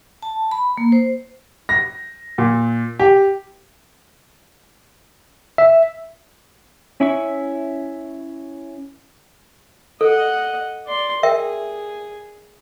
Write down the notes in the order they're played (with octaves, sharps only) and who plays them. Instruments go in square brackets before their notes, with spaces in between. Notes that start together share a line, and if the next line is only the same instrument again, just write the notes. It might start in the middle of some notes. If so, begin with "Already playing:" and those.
[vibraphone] A5
B5
A#3
C5
[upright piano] A#6
A#2
G4
[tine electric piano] E5
[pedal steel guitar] C#4 E4 E5 C#6
[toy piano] A4 [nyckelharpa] D#5 F#5
[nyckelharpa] D5 C6
[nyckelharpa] G#4 [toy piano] A#4 E5 G5